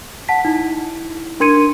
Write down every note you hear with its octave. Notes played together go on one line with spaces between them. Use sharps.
F#5 A5 B6
D#4 E4
D4 A#4 C6 G#6 C#7 D#7